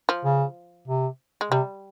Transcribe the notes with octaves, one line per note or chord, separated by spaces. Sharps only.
F3
C#3
C3
G#3
C3 G3